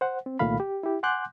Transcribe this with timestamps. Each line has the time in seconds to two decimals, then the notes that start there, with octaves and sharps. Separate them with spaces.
0.01 C5 F#5
0.26 C4
0.39 C2 A#2 D#3 A3 F5 B5
0.60 G4
0.83 E4 G4
1.03 F#5 G#5 C6 D6 F#6 G6